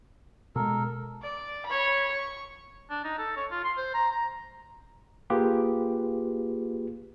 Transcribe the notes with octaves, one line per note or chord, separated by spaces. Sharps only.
B2 G#3 A4 A#4
D5
C#5 B5
C#6
D4
D#4
A4
C#5
F4
C6
C5
A#5
A#5
A#3 F4 G4 G#4 B4